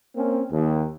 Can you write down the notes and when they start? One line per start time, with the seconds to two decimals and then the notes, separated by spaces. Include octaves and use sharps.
0.16 A#3 C4 C#4
0.52 D#2